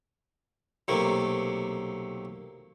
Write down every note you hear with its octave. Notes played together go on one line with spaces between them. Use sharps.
B1 C3 A3 A#3